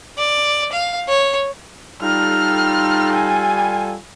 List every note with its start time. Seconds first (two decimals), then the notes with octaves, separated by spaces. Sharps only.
0.18 D5
0.72 F5
1.08 C#5
2.02 G3 D#4 F4 A4 F6
3.12 G#5